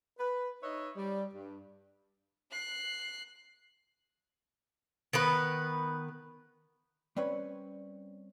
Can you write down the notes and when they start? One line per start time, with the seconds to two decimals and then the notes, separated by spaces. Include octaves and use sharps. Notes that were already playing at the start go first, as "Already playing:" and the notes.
0.18 B4
0.63 D#4 B4 C#5 D#5 E5
0.97 G3
1.34 G2
2.51 F#6 C7
5.13 D#3 B3 B4
7.16 G3 C4 C#4 B4 C#5